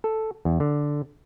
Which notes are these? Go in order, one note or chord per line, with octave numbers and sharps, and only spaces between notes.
A4
E2
D3